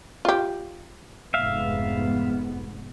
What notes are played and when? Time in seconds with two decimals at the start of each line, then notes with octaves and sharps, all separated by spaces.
0.25 F4 G4
1.34 F1 G#2 B3 E5 F5